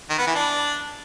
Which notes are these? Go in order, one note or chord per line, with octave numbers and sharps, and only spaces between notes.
D#3
B3
E3
D4